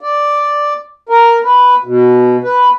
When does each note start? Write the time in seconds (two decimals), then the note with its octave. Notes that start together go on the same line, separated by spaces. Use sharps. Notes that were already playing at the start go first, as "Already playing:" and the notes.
0.01 D5
1.09 A#4
1.44 B4
1.84 B2
2.44 B4